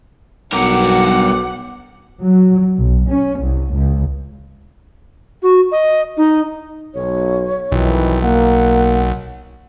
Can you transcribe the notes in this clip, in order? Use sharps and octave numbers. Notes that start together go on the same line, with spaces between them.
B1 G2 B2 A#4 F#5 D6
F#3
B1
C#4
C2
C#2
F#4
D#5
D#4
B1 C#5
B1 F2 D#3 E3
A#3 F#5